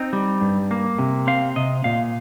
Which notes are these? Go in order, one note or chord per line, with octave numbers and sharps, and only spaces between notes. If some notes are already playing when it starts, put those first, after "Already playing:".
Already playing: C4 D#4
G3
G2
A#3
C3
C4 F5
C3 D#5
A#2 F5